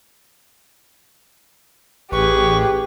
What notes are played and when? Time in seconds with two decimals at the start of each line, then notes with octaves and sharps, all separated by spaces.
2.12 A1 G4 G#4 B4 C#6